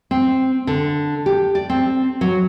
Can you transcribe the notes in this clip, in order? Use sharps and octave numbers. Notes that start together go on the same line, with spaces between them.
C4
D3
G4
D5
C4
F#3